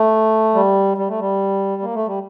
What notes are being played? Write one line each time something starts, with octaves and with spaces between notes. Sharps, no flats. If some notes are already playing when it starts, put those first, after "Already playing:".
Already playing: A3
G3
G3
A3
G3
A#3
A3
G3